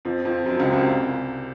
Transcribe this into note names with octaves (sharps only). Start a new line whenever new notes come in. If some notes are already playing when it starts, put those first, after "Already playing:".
F2 F3
F2 F3
F#2 F#3
C#2 C#3
C2 C3